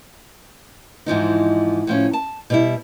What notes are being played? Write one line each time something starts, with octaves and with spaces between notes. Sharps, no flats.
G#2 E3 F3 D#4
A2 F3 C#4
A5
B2 G3 E4